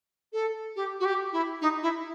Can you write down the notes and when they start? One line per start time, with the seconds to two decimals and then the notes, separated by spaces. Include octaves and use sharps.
0.33 A4
0.76 G4
1.00 F#4
1.05 G4
1.33 E4
1.61 D#4
1.82 E4